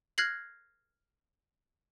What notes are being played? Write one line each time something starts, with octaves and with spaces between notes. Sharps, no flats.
F6 F#6 G#6 A#6 C7 F#7